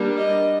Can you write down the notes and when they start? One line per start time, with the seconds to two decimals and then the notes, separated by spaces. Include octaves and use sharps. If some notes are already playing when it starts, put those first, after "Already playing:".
Already playing: G3 A#3 D4
0.16 D#5